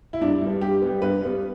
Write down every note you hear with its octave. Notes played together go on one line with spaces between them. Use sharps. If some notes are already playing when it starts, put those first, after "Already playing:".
E4
G2 D4
G3 B3
G2 G4
G3 B3
G2 B4
G3 B3